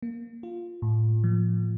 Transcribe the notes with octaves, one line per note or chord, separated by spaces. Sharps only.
A#3
F4
A2
F3